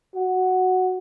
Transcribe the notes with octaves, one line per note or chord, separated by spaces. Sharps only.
F#4